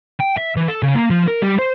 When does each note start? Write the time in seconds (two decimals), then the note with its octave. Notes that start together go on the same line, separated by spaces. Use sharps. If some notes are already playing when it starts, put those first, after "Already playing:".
0.20 G5
0.37 E5
0.56 E3
0.68 A4
0.83 C#3
0.95 A#3
1.10 F3
1.28 A#4
1.42 G3
1.59 C5